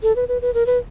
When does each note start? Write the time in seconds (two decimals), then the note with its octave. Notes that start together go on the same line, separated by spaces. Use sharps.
0.03 A4
0.16 B4
0.28 B4
0.42 B4
0.54 A#4
0.66 B4